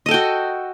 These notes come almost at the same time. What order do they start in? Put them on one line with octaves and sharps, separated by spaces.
D#5 A4 G5 F#4